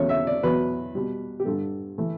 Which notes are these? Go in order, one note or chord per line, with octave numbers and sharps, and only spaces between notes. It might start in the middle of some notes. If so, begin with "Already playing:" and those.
Already playing: E2 C#3 F#3 A3 C#5
E5
D5
E2 B2 F#3 B4
B2 G3
G4
G2 D3 G3 A4
E3 A3